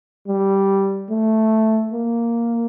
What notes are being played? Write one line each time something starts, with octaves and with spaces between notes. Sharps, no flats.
G3
A3
A#3